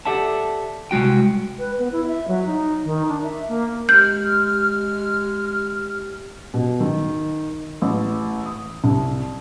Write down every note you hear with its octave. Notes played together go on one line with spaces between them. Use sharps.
G4 A4 D5 E5 F#5 A5
C2 G#3 F#4 G5
B4
B3
E4
E5
F#3
D#4
D#3
D4
E5
A#3
G#3 G4 F6 G6
B2
D#3
A1
D#6
C2